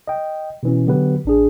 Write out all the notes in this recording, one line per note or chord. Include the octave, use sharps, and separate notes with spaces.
D#5 G5
B2 E3 C#4
D3 F#3 B3 G4 B4
A1 D4 G#4